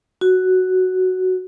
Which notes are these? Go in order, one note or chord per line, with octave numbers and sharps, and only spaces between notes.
F#4